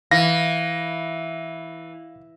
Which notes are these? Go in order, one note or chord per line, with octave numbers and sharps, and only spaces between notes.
E3 F5 A#6